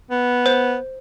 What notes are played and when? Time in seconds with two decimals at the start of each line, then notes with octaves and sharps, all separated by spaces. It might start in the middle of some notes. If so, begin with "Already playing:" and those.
0.11 B3
0.46 C5